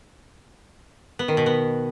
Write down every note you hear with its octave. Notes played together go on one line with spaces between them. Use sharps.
B3
D#3
B2
B3